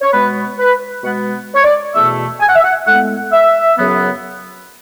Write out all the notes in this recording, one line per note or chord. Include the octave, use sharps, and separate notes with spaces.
C#5
B2 G#3 B3 B4
B4
B2 G#3 B3 F#5
C#5
D5
E2 B2 A3 E5
G#5
F#5
E5
F#5
A2 G#3 B3 F#5
E5
F#2 C#3 F#3 B3